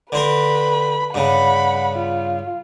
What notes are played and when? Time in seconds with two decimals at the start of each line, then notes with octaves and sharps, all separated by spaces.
0.12 D3 C4 A#4 B4 B5
1.14 G2 C#3 F#5 B5
1.95 F4